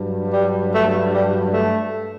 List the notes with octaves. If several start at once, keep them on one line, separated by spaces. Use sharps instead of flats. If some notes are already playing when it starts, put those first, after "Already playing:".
Already playing: G2 F#3
G3
A3
G3
A3